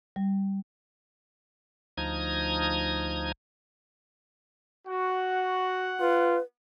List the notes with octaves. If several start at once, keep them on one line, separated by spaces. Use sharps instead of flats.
G3
D2 F3 D#4 A#5 D#6 G#6
F#4 F#5
F4 B4